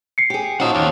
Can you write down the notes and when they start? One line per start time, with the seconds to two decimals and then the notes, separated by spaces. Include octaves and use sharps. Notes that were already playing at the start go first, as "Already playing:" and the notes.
0.18 C7 C#7
0.30 G4 G#4
0.60 F3 F#3 C#4 D#4 D#5 F#5
0.75 D#2